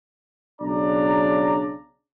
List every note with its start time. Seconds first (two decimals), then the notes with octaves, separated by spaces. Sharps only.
0.61 B1 C#3 D4 D5 A#5